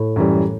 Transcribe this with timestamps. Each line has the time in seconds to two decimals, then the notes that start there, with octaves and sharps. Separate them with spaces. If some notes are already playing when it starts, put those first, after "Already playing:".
Already playing: A2
0.16 F#2 E3 G3